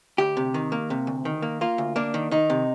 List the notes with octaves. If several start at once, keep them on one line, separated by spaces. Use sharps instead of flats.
D2 G4
C3
D#3
A#3
C3
D2
D#3
A#3
A#3 F4
D2
A#3 D4
D#3
D#3 D#4
C3